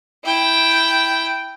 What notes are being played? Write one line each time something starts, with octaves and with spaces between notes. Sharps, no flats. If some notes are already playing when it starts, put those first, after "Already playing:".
E4 G5